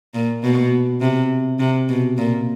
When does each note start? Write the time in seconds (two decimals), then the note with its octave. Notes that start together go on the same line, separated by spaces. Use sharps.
0.14 A#2
0.44 B2
1.01 C3
1.59 C3
1.89 B2
2.18 A#2